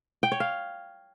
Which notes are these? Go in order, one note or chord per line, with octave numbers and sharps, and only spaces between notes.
G5
C#5
F5